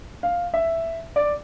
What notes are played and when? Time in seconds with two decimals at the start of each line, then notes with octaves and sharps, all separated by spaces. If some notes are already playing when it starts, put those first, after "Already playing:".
0.23 F5
0.54 E5
1.16 D5